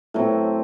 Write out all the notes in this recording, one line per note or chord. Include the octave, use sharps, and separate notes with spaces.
A2 F#3 C4